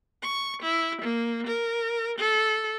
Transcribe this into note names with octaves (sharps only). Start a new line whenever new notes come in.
C#6
E4
A#3
A#4
A4